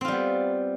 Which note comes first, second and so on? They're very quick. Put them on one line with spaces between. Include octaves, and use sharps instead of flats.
C4 F4 G3 B3